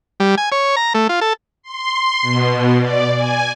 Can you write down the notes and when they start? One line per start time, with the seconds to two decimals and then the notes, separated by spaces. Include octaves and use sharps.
0.20 G3
0.38 G#5
0.52 C#5
0.77 A#5
0.94 A3
1.09 F4
1.21 A4
1.63 C6
2.22 B2
2.79 D5
3.14 G#5